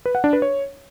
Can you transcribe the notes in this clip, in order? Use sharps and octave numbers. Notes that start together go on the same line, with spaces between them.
B4
F#5
D4
B4
C#5